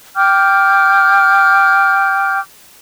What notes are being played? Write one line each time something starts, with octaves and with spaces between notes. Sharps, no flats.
G5 D6 F6 G6